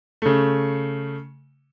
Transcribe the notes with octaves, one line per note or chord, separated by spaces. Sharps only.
C#3 A3